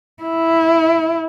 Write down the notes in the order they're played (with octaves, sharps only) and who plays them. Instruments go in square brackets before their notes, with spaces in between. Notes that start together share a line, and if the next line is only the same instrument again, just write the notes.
[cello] E4